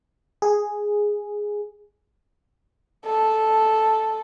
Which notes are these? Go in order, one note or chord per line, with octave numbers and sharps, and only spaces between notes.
G#4
A4